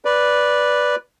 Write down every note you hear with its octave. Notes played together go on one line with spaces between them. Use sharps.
B4 D5